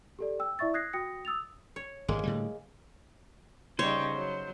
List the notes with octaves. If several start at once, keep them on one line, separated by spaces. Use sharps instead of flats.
G4 A4 D5
G5 E6
E4 D5 E5 C#6 A6
D#6 F#6 G#6 A#6 C7
F#4 G5 D#6 A#6 C#7
D#6 E6 A6 F7
C#5
G#1 G2 G#3 A#3
A2 D3 G3
C#3 G3 D#4 C5 C#5
F#3